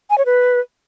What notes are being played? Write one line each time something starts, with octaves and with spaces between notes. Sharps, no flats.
G#5
C#5
B4